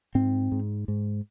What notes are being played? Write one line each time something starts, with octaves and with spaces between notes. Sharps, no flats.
G#2 C4
G#2
G#2